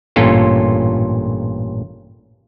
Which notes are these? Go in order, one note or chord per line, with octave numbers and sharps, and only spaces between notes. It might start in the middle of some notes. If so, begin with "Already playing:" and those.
A1 G2 A#2 C#4 F4 A4